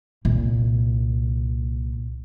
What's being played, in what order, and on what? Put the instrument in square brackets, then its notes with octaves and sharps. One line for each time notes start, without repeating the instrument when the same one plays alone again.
[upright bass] C2 A#2